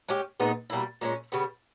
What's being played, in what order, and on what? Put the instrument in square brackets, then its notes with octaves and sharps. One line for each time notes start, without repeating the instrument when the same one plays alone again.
[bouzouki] G#3 C#4 G4
A#2 G#3 B3 D#4
B2 G3 A#3 E4
A#2 G#3 C#4
C#3 G3 B3